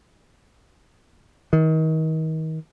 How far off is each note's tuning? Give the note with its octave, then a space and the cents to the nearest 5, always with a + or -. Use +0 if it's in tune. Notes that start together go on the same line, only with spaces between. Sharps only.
D#3 +35